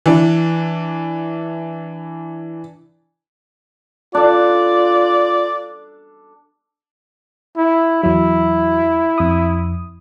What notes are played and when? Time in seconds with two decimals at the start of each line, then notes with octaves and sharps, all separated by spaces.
0.06 E3 D4
4.15 D4 F4 A4 D5
7.57 E4
8.03 E2 F#3 E4
9.18 F2 D#6